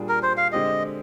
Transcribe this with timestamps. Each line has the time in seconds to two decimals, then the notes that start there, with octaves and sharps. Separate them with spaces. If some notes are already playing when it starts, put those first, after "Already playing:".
Already playing: A#2 G3 D4 F4 G#4
0.09 A#4
0.23 C5
0.37 F5
0.52 D3 G#3 C4 G4 D#5